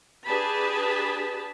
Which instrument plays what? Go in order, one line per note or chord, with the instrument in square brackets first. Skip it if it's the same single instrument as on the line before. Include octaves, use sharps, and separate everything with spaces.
[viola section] D4 G4 G#4 B4 A5 B5